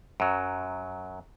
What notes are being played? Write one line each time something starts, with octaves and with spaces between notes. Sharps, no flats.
F#2 F#3